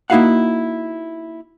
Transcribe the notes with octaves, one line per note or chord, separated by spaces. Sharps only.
A#3 D#4 E4 F#4 F5 F#5